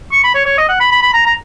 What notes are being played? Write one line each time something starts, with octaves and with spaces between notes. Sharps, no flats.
C#6
B5
C#5
C#5
D#5
F#5
B5
B5
B5
A#5
A#5